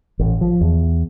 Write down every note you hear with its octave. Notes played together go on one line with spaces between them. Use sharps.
A1
F3
E2